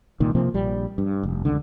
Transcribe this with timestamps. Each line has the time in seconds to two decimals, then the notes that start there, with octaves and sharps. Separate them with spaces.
0.20 C2 A#2 D#3
0.35 C3 F3 A#3 C4
0.54 A#1 G3
0.98 G2
1.23 F1
1.45 F1 C#2 D3